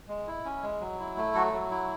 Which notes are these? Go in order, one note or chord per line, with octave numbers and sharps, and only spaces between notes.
G#3
E4
C#4
G#3
F#3
E4
A3
F#3 F#4 A4
F#3
E4